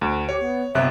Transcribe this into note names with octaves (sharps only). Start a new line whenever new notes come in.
D2
G4 C#5
B3
G1 C3 E5 F#6